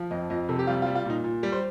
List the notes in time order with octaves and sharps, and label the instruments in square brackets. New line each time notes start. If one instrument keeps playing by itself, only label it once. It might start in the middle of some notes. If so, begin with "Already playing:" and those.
Already playing: [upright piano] F3
F2 D#5
F2 D#5
C3 A4
G4
G3 F4
F4
G3
F4
A#2 D#4
A#2
G3
C5